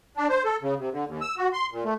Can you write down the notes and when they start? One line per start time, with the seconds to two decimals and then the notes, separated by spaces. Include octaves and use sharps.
0.17 D4
0.29 C5
0.44 A4
0.62 C#3
0.79 C3
0.92 D3
1.07 D#2
1.21 E6
1.37 F#4
1.53 C6
1.72 A#2
1.84 A3